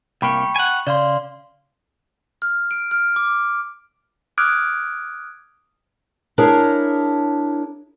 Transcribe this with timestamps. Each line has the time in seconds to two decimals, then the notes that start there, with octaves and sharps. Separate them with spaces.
0.22 C2 A#3 G5 B5 C#6
0.56 F#5 G#5
0.87 C#3 D5 F5 C6
2.42 F6
2.71 D7
2.91 F6
3.16 D6
4.38 D6 D#6 F6 F#6 G#6 D7
6.38 D4 E4 G#4 A#4 C#5